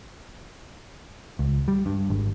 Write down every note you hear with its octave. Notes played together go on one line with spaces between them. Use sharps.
C#2
G3
G2
G#1